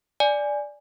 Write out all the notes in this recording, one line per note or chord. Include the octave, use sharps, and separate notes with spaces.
D5 G#5